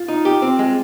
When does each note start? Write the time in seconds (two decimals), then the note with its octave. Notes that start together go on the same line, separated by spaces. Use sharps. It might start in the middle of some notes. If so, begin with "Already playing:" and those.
Already playing: F4
0.08 D#4
0.25 G4
0.42 C4
0.59 G#3